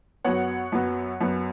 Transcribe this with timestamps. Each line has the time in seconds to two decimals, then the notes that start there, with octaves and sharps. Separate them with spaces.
0.25 F#2 F#3 B3 C#5 F#5
0.72 F#2 F#3 B3
1.21 F#2 F#3 B3